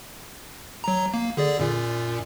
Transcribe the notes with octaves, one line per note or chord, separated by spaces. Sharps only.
F#3 A#5
A#3
D3 G#4 D5
F#2 A#2